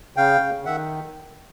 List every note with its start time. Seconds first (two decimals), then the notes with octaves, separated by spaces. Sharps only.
0.17 C#3 F5 G5
0.41 C#3
0.65 D#3 E5 F#5